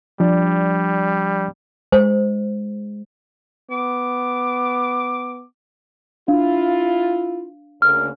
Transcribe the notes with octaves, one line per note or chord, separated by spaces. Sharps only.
F3 G3 D4 D5
G#3 C5
B3 D6
D4 E4 F4 F5
D2 C#3 A#3 F6